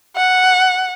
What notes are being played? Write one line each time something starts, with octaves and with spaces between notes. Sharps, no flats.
F#5